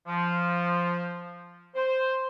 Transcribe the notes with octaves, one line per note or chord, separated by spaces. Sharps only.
F3
C5